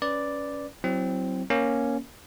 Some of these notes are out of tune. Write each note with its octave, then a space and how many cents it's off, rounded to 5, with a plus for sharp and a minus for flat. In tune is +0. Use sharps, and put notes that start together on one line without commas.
C#4 +10 B4 +0 D5 +0
F#3 +25 C4 +0 E4 +0
A#3 +10 C#4 +0